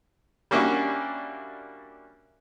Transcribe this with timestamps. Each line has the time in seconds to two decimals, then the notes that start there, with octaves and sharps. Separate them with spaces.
0.51 G3 A#3 C#4 D4 E4 F#4